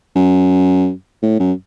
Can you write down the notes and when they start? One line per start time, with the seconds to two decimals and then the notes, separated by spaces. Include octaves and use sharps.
0.16 F#2
1.22 A2
1.40 F#2